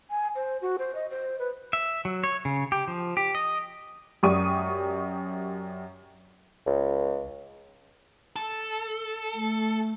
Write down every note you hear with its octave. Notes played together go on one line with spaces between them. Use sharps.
G#5
C5
F#4
C5
D#5
C5
B4
E5
F#3
C#5
C#3
G4
F3
G4
D#5
F#2 G4 D5 C#6 D#6 D#7
C#2
A4
A3